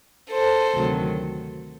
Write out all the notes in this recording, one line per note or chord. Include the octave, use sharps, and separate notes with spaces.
A4 C5
D2 C3 D#3 F#3